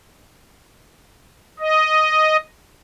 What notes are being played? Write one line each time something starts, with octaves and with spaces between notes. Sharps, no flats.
D#5